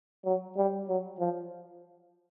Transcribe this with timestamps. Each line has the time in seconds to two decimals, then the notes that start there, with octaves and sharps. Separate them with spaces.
0.25 F#3
0.57 G3
0.88 F#3
1.19 F3